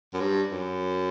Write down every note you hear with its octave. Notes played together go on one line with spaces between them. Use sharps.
F#2
G2
F#2